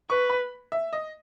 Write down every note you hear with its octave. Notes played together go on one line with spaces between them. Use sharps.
B4 C#6
B5
E5
D#5